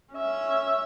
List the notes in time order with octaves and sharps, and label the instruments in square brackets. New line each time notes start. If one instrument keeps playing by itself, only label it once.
[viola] C#4 E5